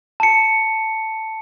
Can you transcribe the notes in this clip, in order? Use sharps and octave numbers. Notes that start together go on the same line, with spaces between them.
A5 C#7